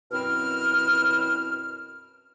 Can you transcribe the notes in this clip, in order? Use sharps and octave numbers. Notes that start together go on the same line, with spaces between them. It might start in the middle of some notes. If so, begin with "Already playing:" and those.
F#2 B2 C4 E4 F6